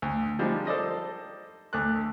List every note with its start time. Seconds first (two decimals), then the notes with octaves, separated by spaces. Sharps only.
0.02 D2
0.39 F3 G3 G#3 D4 D#4
0.67 A4 C5 D5 D#5
1.73 D2 A3 D6 F#6